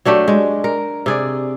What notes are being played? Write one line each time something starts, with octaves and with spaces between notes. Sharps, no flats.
F#3 A3 D4 G4
G#3
A#4
C3 G#4 D5